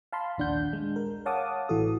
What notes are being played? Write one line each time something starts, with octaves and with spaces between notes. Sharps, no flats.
F5 A5 B5 C6
A#1 D#2 D4 F#5 G6
G#3
A#4
C#5 F5 F#5 A5 D6 D#6
A1 E3 F#4 A4 D#6